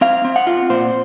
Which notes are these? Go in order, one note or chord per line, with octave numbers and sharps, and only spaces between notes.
C4 F5
C4
F#5
F4
A#2 C5